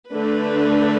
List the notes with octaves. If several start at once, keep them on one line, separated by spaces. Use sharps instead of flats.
D3 A3 D4 B4